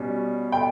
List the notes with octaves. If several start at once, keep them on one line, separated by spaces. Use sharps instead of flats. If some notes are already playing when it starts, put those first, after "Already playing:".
Already playing: B2 G3 C#4
G5